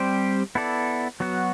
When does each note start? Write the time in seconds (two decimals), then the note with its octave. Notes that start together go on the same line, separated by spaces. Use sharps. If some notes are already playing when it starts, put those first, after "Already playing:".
Already playing: G3 C4 G4 C5
0.55 B3 E4 A4 D5
1.20 F#3 B3 F#4